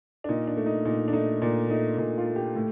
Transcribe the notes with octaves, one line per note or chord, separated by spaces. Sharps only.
D4
A#2 D#4
D4
A3
D#4
A#2 D#4
D4
A3 D#4
A#2 D4
A3 D#4
A#2 D#4
F4
A3
G4
A2